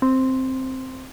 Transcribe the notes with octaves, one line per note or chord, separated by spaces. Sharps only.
C4